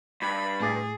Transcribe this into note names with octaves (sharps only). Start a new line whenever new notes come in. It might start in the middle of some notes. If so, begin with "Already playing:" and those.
G2 B5
A2 G#4 D6 A6